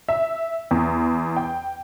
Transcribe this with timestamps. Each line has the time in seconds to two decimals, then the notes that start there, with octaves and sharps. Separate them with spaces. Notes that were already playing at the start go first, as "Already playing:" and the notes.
0.09 E5
0.71 E2
1.36 G5